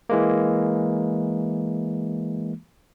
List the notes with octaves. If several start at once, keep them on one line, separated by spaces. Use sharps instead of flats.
E3 G#3 A#3